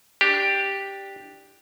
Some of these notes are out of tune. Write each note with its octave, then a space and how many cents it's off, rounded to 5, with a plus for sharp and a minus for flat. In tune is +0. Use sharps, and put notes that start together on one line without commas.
D4 +0 G4 +0